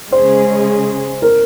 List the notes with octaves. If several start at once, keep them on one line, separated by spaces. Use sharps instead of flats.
C#3 G#3 C#4 G#4 C5
A#4